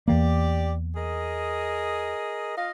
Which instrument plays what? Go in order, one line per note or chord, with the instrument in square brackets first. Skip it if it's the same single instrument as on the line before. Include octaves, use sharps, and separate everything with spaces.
[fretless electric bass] E2 E3 A#3 [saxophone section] G4 D5
[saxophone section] G#4 A#4 D#5
F4 D#5 F5